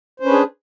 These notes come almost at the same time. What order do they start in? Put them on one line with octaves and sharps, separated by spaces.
C5 C#4 B4 D4 G#4